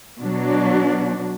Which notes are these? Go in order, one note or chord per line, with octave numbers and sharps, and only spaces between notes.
B2 F#3 D4